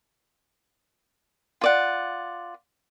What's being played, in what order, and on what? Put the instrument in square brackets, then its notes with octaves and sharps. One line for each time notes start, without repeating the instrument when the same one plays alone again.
[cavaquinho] F4 D5 F#5